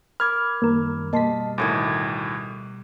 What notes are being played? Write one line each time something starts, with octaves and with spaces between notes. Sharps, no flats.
A#4 B5 D6 F6 G#6
F#2 D#3 G3 A#3 A#4
B2 G3 A#3 D#5 A5 C6 B6
D2 A2 D#3 D6 D#6 G#6